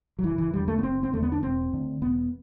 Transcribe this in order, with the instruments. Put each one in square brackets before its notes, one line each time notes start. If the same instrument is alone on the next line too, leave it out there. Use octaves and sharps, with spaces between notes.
[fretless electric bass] F#3
F#1 E3
E3
E2 D3 G3
A3
B3
F#1 C4
C4
E2 D3 A3
B3
D4
E1 C4
D2 D3
E1 B3